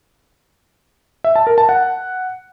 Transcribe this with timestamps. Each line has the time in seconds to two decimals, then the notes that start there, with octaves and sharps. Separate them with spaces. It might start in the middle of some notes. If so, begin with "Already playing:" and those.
1.24 E5
1.36 A5
1.47 A#4
1.58 A5
1.69 F#5